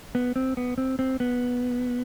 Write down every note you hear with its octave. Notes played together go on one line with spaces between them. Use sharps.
B3
C4
B3
C4
C4
B3